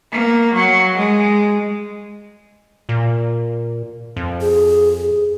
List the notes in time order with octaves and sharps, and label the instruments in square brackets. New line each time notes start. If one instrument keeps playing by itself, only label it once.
[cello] A#3
F#3
G#3
[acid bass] A#2
F2
[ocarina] G#4